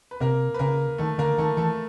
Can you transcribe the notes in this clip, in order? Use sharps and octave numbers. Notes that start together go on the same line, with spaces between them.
B4
C3 A#3 A#4
B4
C#3 A#3 A#4
D#3 A3 A4
D3 A#3 A#4
D#3 A3 A4
E3 A3 A4